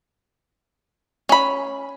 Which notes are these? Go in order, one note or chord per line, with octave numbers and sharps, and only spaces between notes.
C#4 B5